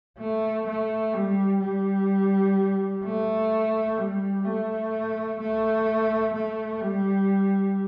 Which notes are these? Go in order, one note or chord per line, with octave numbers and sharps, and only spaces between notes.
A3
A3
G3
G3
A3
G3
A3
A3
A3
G3